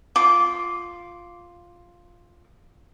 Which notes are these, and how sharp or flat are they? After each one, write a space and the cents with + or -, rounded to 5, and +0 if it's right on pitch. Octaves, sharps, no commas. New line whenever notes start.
F4 +0 D6 -15